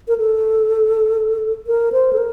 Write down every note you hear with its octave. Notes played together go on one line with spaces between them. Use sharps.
A#4
A4
A#4
C5
A4
A#4